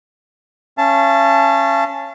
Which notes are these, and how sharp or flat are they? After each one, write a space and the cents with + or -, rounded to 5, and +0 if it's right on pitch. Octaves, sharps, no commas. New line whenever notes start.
C#4 -10 F5 -45 A5 +0